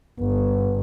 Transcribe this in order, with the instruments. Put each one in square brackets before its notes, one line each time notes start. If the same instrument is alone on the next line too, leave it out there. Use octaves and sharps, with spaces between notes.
[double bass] G1 [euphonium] B3